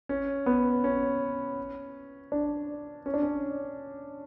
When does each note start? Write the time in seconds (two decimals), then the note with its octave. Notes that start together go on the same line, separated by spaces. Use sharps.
0.09 C#4
0.46 B3
0.84 C#4
2.32 D4
3.06 C#4
3.14 D4
3.22 C#4